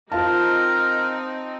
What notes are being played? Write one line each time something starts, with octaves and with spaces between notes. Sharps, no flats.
C4 D#4 F4 A#4 F5 A5